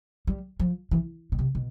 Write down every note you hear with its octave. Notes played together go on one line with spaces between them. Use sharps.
G3
F3
E3
B2
C3
B2